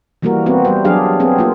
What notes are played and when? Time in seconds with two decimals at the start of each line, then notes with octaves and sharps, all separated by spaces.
0.22 E3 G3 A#3 F#4 A#4
0.46 B3 C4 F#4
0.65 G3 C5
0.85 F#3 D4 G4 G#4 F5
1.20 B3 C4 G#4
1.38 A#3 F4